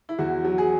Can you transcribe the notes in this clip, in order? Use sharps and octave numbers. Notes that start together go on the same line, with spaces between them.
E4
E2 F#4
F#3
G#4